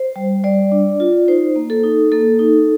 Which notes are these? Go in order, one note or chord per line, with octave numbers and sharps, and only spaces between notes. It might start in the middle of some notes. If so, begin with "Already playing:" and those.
Already playing: C5
G3
G3 D5
D4
F4
D#4 C5
A#3
A4
D#4
A#3 A4
D#4